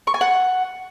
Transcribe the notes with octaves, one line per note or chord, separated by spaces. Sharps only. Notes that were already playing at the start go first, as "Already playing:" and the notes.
C#6
G#5
F#5